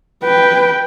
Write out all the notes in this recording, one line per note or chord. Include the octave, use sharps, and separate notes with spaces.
B4 G5